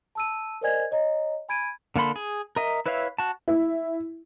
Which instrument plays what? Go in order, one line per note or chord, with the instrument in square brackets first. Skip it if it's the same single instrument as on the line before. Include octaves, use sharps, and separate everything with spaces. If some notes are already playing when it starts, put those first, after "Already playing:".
[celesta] A5 E6 D#7
A#4 C5 D5 D#5 G#5 G#6
C#5 D#5 A#5
G#5 B5 G#6 D7 D#7
[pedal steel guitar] D3 A#3 A4 B5 C6
G#4
A#4 D#5 E5
E4 B4 C#5 E5 F5
F#4 A5
[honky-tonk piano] E4